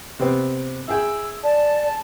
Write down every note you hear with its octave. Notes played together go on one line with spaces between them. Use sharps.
C3 B3 C4
E4 G#4 G5 E6
D5 A5